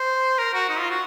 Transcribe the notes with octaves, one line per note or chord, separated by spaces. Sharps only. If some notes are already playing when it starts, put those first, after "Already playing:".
Already playing: C5
A#4
F#4
D#4
F4
F#4